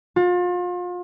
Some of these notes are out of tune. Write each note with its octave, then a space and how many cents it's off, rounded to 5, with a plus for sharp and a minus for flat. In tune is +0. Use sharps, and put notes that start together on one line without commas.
F4 +35